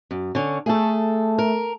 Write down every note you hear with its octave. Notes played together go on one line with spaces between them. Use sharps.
F#2
D3 C#4
A3 G#4 A4
A#4